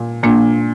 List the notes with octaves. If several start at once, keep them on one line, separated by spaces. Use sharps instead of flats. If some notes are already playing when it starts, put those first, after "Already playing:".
Already playing: A#2
A#2 A#3 D4